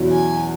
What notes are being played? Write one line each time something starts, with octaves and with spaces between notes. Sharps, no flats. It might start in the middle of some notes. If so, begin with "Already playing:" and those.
Already playing: E2 B2 F#3 C#4 E4
G#5